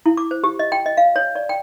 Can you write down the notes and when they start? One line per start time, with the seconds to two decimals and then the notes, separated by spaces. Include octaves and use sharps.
0.06 E4
0.17 D6
0.31 C5
0.44 G4
0.59 D#5
0.72 G5
0.86 D#5
0.97 F5
1.16 C#5
1.36 D5
1.49 G5